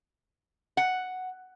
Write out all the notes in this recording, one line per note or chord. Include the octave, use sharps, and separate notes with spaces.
F#5